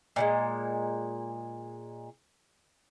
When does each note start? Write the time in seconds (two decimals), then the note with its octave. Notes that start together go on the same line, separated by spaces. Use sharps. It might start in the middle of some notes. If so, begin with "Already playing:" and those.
0.16 A#2 G3 G#3